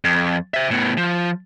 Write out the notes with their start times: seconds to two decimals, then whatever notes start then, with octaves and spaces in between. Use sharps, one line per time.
0.05 F2
0.54 C5 E5
0.71 A2 B3
0.98 F3